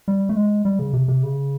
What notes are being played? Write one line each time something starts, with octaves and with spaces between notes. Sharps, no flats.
G3
A3
G#3
G3
C#3
C3
C3
C#3